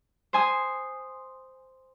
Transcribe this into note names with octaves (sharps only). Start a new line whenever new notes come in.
C5 G#5 D#6